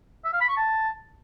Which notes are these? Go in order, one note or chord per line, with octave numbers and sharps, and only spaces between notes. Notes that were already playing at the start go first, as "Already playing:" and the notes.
E5
F5
B5
C#6
A5